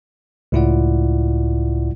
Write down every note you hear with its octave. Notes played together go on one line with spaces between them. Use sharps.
C#2 A2 E4 F4 D5 F#5